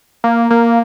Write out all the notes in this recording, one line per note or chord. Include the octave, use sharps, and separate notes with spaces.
A#3
A#3